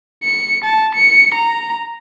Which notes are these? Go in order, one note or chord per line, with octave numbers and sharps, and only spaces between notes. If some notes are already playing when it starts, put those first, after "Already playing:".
C#7
A5
C#7
A#5